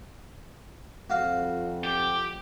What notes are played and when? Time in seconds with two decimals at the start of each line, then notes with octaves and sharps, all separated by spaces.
1.10 F2 F#4 F5
1.84 G4